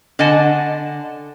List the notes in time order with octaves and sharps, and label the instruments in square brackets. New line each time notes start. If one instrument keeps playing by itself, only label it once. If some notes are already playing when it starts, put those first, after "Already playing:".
[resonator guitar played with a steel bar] D3 D#5 F#5 G#5 A5